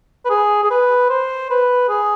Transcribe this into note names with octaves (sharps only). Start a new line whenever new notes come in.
B4
G#4
G#4
B4
C5
B4
G#4